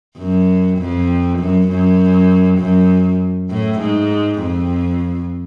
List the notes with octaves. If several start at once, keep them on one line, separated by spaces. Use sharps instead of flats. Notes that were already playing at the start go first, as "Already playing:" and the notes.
F#2
F2
F#2
F#2
F#2
A2
G#2
F2